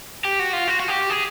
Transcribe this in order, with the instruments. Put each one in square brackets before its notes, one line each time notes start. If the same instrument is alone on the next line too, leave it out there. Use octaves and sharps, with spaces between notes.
[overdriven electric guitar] G4
F#4
F4
F#4
F#4
G4
G#4